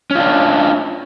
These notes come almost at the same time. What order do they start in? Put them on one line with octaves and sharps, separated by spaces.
C#4 F4 D4